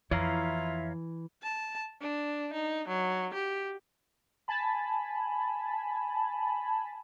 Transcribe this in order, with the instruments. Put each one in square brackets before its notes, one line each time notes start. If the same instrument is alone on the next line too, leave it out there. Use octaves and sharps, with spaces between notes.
[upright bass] F2 [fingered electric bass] E3 [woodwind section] E4 F4 E5 [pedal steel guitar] C#5 F5 A#5
[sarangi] A5
D4
D#4
F#3
G4
[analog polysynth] G#5 A5 B5